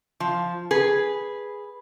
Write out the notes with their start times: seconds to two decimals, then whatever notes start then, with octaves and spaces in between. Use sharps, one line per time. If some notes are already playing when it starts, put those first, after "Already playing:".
0.20 F3
0.71 G#4 B4